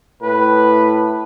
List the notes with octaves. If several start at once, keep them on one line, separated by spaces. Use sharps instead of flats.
A2 B4